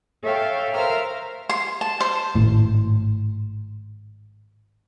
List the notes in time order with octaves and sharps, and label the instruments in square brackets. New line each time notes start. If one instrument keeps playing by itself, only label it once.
[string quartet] A4 C#5 E5 F5 G5
A#4 C5 E5 F5 A#5 F6
[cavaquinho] C6
A5
C5
[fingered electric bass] G#1 A2